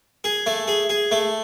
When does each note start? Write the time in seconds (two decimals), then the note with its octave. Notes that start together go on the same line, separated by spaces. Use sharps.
0.24 G#4
0.46 A3
0.68 G#4
0.89 G#4
1.11 A3